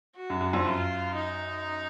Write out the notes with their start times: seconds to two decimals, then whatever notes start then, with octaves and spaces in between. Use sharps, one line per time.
0.16 F#4
0.30 F#2
0.41 F#2
0.53 F2
0.65 F#2 F4
1.14 D#4